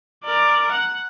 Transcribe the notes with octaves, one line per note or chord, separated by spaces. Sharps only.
A#4 D5
F#5